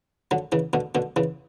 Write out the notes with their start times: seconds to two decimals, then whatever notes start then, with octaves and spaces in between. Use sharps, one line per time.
0.31 D3 F#3
0.52 C#3 E3
0.73 B2 D3
0.95 B2 D3
1.16 C#3 E3